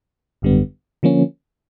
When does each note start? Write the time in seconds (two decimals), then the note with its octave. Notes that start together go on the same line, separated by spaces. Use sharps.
0.42 G#1 F#2 D3 G3 B3
1.03 D3 F3 A#3 C#4